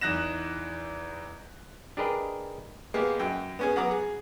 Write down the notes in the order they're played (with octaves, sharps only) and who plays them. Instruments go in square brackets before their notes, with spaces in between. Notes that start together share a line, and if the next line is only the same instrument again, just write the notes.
[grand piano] E2 D#4 F#6 A#6 E7
[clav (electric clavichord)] D4 G4 G#4 A#4 B4 D#5
[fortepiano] G#3 A#3 B3 G4 G#4
F#2 G5
B3 C#4 G#4
F#3 B3 F#5 A#5 D6 D#6
G#4